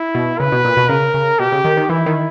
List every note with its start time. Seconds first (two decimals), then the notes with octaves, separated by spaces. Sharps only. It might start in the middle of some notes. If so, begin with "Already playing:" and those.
Already playing: E4
0.15 B2
0.40 C#3 B4
0.52 B2
0.65 A#2
0.77 B2
0.89 C#3 A#4
1.14 C#3
1.39 B2 G4
1.52 C#3
1.65 D#3
1.77 D#3
1.89 E3 E4
2.06 D#3